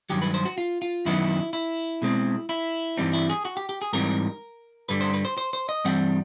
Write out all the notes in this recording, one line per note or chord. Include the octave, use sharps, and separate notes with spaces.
G2 D#3 F#3 G4
B4
C5
F#4
F4
F4
F#2 D#3 F#3 B3 D#4 E4
E4
B2 G#3 C4
E4
G2 E3 G3 C4 D#4
E4
G#4
F#4
G4
G4
G#4
G#2 E3 G3 C4 D#4 A#4
G2 D3 G3 B4
C5
B4
C5
C5
C5
D#5
G2 E3 G3 C4 F#5